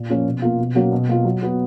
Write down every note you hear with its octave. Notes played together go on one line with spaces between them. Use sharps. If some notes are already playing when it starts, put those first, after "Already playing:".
Already playing: A#2
F3 A#3 C#4 F4
B2
A#3 F4
B2
F#3 A#3 C#4 F#4
B2
A#3 F4
F#3
B3 F#4